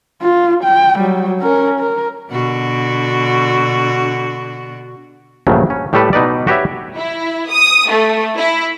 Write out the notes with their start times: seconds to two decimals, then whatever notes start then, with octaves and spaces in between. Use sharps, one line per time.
0.22 F4
0.64 G5
0.99 F#3 G3
1.41 C#4 A#4
1.80 A#4
2.31 B2 D3 F#4
5.47 A#1 G2 C#3 F#3 A3
5.70 C#4
5.93 A2 G3 A3 G4 A4 B4
6.13 B2 D#4 B4 D5
6.47 F#4 G4 B4 C#5 E5
6.95 E4
7.50 D#6
7.89 A3
8.37 E4